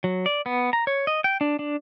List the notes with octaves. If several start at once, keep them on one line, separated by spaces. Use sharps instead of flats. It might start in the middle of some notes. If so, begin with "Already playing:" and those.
F#3
D5
B3
A#5
C#5
D#5
G5
D4
D4